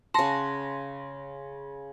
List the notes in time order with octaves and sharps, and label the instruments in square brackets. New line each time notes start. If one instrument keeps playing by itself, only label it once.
[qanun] C#3 F#5 [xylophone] A5 [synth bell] C6 A#6